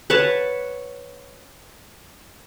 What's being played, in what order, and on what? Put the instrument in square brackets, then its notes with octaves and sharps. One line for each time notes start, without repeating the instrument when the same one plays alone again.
[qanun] B4 C#5 F#5 A5